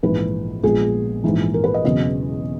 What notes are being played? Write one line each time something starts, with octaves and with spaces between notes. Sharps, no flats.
A#1 G#2 E3 B4
A#1 A#2 G#3 B3 G#4
A#1 G#2 E3
A#4
B4
D#5
E1 E2 C#3 F#3 D#5